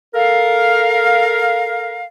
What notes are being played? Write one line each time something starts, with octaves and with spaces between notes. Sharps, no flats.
A4 A#4 F5